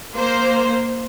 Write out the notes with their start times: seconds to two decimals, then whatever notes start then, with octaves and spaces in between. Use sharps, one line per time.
0.16 A#3 C5